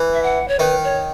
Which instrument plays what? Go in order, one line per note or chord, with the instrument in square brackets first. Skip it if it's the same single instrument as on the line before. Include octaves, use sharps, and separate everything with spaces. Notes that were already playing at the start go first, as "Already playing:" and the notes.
Already playing: [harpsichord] E3
[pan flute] E5
F#5
C#5
[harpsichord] D#3 [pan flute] B4
[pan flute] C#5